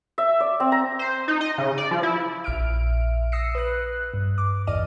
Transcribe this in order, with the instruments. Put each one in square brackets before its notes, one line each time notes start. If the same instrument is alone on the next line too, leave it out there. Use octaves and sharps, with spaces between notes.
[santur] E5
D5
C4
A#5
[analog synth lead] C5
D#4
D#5
C#3
D5
F3
E4
[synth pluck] A#1 E5 F6 D7
D#6 E6 A#6 C7 C#7
B4 F#6
G2
D6
A1 E2 D5 D#5 F6 D#7